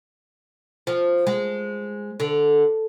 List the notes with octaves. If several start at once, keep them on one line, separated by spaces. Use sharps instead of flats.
F3
G#3
D3